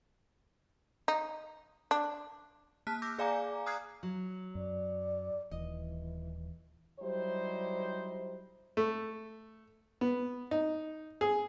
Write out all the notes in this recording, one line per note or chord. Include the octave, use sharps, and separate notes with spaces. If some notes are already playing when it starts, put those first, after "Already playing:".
D#4
D4
A#3 A5 F6 F#6 B6
D6 E6 G6 A#6
G#4 D5 F5 G#5 A#5 D6
A#5 D#6 F6 F#6 G#6 C7
F#3
F#2 D5
D#1 E3 D#5
F#3 G3 D#4 E4 G4 C5
A3
B3
D#4
G#4